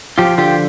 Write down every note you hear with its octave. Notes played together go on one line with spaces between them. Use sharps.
F3 F4 G4
D3 F4 G4